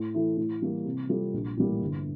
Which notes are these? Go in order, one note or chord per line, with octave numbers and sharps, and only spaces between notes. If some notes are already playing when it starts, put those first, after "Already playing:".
Already playing: A2
E3 A3 E4
A2
E3 G3 A#3
C3
G3 C4 F4 A4
A#1
A2 E3 G3 A#3
G1